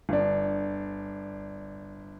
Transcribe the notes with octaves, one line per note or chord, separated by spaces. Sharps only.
G1 D4